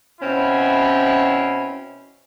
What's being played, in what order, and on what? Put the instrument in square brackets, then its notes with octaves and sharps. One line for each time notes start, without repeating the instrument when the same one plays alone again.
[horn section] B2 C4 C#4 E4